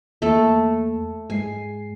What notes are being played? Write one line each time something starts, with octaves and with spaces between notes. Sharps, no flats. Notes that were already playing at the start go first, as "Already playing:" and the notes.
E2 A3 A#3 A4
G#2 G#3 G#5 C7